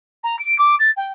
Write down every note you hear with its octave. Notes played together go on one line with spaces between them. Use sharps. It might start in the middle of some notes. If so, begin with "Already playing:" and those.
A#5
D7
D6
A6
G5